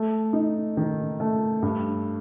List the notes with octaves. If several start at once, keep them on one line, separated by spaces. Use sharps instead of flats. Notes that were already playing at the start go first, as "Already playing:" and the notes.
Already playing: A3
D#4
D#3
A3
G2